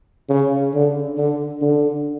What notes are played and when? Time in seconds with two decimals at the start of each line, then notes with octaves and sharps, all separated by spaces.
0.29 C#3
0.74 D3
1.17 D3
1.62 D3